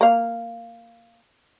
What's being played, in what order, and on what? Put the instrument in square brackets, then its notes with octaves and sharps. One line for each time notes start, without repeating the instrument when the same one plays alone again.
[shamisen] A#3 F5